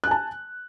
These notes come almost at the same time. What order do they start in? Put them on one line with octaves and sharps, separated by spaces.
F#6 G#5 A5